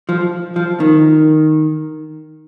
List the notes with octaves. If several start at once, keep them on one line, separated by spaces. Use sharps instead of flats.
F3
F3
D#3